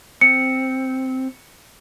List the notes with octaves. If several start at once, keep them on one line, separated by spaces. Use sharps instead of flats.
C4 C#7